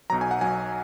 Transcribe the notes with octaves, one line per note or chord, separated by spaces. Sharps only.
B1 B2 F#3 A#5
G#5
F#5
B1 B2 F#3 G#5